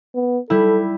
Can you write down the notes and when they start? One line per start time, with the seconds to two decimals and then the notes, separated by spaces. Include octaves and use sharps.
0.15 B3
0.50 G3 E4 A4